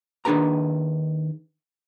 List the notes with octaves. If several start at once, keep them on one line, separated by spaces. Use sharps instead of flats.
D#2 D#3 D4 G#4 B4 A#5